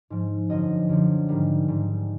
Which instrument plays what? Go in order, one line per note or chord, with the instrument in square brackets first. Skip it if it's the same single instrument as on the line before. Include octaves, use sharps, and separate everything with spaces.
[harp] G#2 F3
F#2 D3 F3 D#5
F#2 D3 F3
G#2 D#3 G3 A#4
G#2 D#3 G3